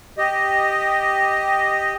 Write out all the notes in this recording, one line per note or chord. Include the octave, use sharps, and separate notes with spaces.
G4 D#5